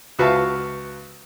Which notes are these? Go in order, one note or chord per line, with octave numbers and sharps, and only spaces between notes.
C#2 F#4 B4 E5 F5 A5